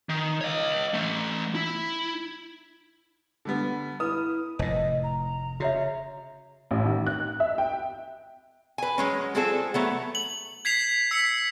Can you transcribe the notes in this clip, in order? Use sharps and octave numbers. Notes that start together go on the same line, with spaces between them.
D#3
C#5 D#5
E3 A3
E4
D3 G3 B3
E4 B4 D#6
F1 A2 D#5
A#5
C#3 F#4 C#5 E5
A1
D#3
F#6
E5
G5
B4 G#5
F#3 G#3 C#4
G3 G#3 C4 F4 G#4 A4
F#3 A3 B3
F#7
G#6 B6 C7 F7
E6 B6 C#7